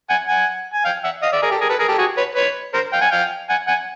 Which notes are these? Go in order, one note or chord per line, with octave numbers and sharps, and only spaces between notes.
F#5 G#5
F#5 G#5
G#5
F5 G5
E5 F#5
D#5 F5
D5 E5
G#4 A#4
G4 A4
G#4 A#4
A4 B4
G#4 A#4
G4 A4
F#4 G#4
B4 C#5
B4 C#5
A#4 C5
F5 G5
F#5 G#5
F5 G5
F#5 G#5
F#5 G#5